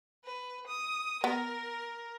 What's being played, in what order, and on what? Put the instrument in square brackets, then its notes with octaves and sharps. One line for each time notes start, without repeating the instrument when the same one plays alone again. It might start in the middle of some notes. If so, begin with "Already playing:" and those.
[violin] B4
D#6
[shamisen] B3 [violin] A#4